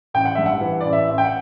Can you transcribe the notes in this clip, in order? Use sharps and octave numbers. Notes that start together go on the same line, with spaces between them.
A1 G5
F#5
G2 E5
F#5
E3
A1 D5
E5
A1
G5
F#5